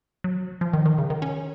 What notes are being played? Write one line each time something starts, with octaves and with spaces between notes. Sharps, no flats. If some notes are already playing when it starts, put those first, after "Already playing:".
F#3
F3
D#3
D#3
C#3
D#3
C#4